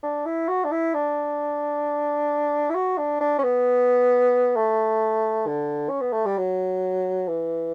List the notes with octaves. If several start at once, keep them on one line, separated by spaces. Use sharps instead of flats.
D4
E4
F#4
D4
E4
D4
E4
F#4
D4
D4
C#4
B3
A3
D3
C#4
B3
A3
G3
F#3
E3